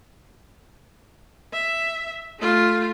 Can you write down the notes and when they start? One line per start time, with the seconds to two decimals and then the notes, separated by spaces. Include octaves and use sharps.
1.53 E5
2.39 A3 F4